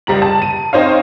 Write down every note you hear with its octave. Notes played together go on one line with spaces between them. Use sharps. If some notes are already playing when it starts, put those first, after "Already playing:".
C#2 G3 A#5 F#7
A5
D#7
C4 D#4 C5 C#5 F5